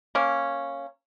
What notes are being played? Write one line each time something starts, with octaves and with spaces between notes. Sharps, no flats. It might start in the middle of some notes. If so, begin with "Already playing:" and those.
A#3 C#4